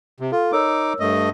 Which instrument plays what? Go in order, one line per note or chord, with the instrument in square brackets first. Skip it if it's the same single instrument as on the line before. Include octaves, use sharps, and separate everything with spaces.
[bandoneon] C3
[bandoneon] F4 [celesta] A4
[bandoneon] D#4 D6 [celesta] A#4 C#5 E6
[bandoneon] G2 A3 D#5